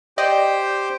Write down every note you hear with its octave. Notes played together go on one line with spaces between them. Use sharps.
G4 C5 D5 D#5 G5